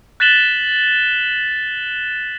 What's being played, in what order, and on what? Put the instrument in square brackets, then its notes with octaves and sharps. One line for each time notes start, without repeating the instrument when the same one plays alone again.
[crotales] F#6 A6 B6 E7 F#7 G7